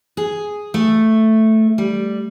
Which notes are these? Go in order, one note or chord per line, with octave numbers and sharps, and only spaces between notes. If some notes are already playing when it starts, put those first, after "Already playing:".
G#4
A3
G3